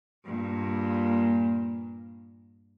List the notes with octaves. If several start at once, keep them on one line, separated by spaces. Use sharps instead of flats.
G2 A#2